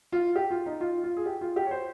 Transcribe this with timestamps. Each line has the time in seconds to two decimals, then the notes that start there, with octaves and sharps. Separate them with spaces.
0.12 F4
0.35 G4
0.51 F4
0.66 D#4
0.81 F4
1.04 F4
1.17 G#4
1.26 G4
1.41 F4
1.56 G4
1.66 C#5
1.71 C5